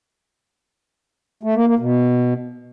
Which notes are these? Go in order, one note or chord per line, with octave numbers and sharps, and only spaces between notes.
A3
A#3
A#3
B2